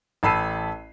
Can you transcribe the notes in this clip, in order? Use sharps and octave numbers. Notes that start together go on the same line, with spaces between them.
A1 A5 B5 E6 C7 D#7